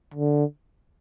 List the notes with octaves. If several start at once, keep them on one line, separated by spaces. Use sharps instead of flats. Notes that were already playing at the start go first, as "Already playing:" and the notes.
D3